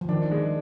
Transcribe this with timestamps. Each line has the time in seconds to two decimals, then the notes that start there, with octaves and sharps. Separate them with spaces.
0.01 F3
0.09 D#3 D4
0.31 G#3